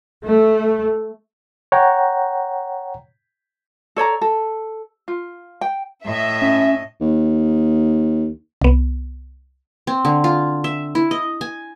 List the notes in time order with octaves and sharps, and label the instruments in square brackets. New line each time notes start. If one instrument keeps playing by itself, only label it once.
[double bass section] A3
[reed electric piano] C#5 F#5 G5 A#5
[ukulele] A4 C#5 D5 A#5
A4
F4
G5
[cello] A2 D#5 [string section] E5
[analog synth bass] C#4
[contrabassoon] D#2
[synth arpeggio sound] C2 B3
[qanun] C4
D3
F4
E5
E4
D#5
G#5